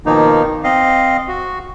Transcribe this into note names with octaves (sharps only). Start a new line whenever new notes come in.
B2 D#3 F3 A#3 D#4
C4 D#5 F5
F#4